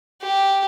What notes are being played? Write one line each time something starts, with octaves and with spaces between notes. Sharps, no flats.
G4